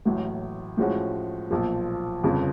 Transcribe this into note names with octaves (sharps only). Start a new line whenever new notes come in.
A1 A2 F#3
A2 F3 G#3 C#4 F#4
B1 A#2 F3
G1 F2 C#3 F3